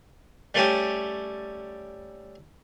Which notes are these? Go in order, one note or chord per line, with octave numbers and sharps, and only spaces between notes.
G3 A3 C#4 G4